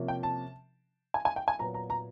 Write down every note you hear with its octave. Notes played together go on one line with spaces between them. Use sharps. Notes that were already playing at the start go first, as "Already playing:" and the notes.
Already playing: C3 F3 A#3 C#4
G5
A5
G#5
G#5
G5
G#5
A#2 F#3 B3 A#5
A#5
A#5